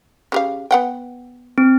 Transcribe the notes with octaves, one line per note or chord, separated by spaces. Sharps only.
C#3 G4 F5
B3 F#5 G5
C4